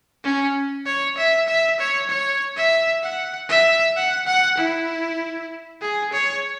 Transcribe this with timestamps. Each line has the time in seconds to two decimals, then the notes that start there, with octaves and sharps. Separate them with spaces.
0.24 C#4
0.86 C#5
1.17 E5
1.48 E5
1.79 C#5
2.09 C#5
2.57 E5
3.03 F#5
3.49 E5
3.96 F#5
4.27 F#5
4.57 E4
5.81 G#4
6.13 C#5